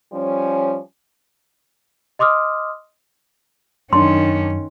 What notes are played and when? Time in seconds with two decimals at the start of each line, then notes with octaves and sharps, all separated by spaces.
0.12 F3 G3 C#4
2.19 D#5 C6 D6 D#6 F6
3.93 F#2 D#3 C#4 D4 C6